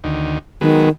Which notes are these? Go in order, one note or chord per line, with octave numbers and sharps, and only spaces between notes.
D2 D#3
D#3 F#3 G#3 B3